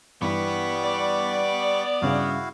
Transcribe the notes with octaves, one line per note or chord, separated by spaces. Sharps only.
G2 E3 G3 B3 B4 C#6 D6
D5
G2 C#3 E4 F#4 G#4 F5